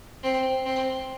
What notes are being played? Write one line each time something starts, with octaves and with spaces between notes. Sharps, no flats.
C4
C4